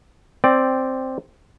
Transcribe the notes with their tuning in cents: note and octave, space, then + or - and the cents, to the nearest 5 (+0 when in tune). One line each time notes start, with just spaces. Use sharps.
C4 +0 D5 +0 G5 +0